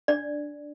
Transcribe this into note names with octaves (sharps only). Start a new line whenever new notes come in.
D4 D5